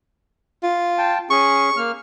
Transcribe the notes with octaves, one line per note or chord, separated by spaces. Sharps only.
F4
G5 A5
C#4 G#4 C#6
A#3 F6